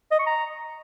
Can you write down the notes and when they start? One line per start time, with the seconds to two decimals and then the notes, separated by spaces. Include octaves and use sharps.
0.12 D#5
0.19 C#6
0.26 A#5